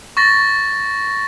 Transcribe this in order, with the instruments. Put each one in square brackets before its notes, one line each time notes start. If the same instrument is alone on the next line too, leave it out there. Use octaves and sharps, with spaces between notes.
[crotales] C#6 A6 A#6